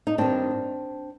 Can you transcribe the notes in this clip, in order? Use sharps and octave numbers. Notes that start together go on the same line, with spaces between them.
D#4
G2 D#3 C4 D4